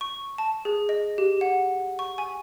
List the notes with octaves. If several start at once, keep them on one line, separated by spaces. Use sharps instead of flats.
C#6
A5
G#4
D#5
G4
F#5
C#6
G#5